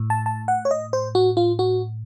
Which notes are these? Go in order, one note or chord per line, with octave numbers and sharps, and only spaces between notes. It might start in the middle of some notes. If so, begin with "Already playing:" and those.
Already playing: A2
A5
A5
F#5
C#5
D#5
C5
F#4
F4
F#4